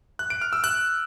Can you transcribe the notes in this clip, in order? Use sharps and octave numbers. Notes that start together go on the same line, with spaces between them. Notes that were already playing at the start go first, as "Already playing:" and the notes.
F#6
D7
F6
E6
F#6